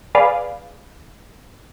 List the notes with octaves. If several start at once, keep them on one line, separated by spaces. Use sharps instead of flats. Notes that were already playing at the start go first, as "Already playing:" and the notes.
G#4 B4 D5 F5